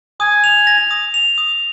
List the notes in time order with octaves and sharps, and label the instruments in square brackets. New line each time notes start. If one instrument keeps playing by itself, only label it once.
[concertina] G#5 [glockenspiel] D#6
[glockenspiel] F7
A#6
D#6
F7
D#6